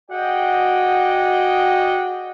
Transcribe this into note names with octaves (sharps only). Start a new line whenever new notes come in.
F#4 G#4 D5 D#5 F#5 G5